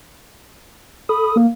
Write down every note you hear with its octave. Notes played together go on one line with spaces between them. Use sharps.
A4 B5 D#6
A#3